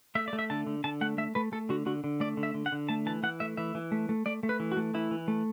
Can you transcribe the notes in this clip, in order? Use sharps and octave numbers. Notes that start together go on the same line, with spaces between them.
A3 E5
D5
A3
E5
D3 A5
D3
D3 A5
A3 F#5
A3 E5
A3 B4
A3 A4
D3 F#4
D3 F#4
D3
A3 D5
D3
E5
D3
F#5
D3
A3 A5
E3 A5
E3 F#5
A3 E5
E3 E5
E3
A3
A3
A3 D5
A3
B4
E3
F#4
A3
E3 E4
E3
A3